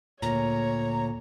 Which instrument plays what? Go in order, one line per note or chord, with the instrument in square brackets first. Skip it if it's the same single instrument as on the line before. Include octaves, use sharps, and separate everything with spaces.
[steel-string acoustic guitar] D2 A#2 [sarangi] C#5 [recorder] A#5